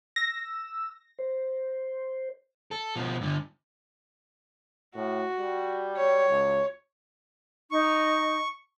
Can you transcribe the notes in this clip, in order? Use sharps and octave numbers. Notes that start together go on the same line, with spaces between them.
E6 A#6
C5
A4
B2 F3
G2 D3
A2 F#4
G3
C#5
C#2
D#4 C#6